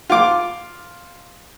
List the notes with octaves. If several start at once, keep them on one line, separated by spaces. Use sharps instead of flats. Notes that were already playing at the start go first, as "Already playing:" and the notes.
F4 D6